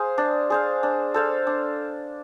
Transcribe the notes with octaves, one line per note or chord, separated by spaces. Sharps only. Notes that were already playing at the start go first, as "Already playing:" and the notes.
Already playing: G#4 C5 F5
D4
G#4 C5 F5
D4
A4 C5 F5
D4